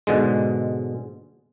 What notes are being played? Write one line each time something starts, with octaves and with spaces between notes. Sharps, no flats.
G#2 B2 D3 G#3